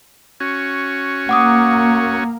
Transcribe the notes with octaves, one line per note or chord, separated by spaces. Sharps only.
C#4 F#4
A#3 F#5 D6 D#6